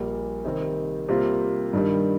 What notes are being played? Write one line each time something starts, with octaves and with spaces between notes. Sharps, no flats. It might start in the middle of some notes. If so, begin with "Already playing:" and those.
Already playing: A#1 A#2 G3 A#3
C3 D#3 G3 C4
C3 G3 A#3 F4
G2 D#3 G3